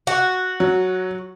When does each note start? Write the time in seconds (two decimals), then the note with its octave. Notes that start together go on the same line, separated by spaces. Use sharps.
0.07 F#4
0.60 F#3